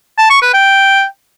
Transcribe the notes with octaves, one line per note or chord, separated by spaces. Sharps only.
A5
C#6
B4
G5